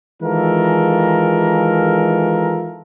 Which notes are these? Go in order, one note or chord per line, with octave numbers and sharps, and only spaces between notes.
D#3 E3 G#3 F4 A4 A#4